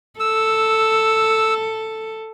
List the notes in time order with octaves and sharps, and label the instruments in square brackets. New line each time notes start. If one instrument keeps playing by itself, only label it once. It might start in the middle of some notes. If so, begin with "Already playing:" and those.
[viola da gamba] A4 [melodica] E6